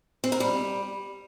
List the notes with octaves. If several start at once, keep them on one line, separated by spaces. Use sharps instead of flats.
C4
A#4
G3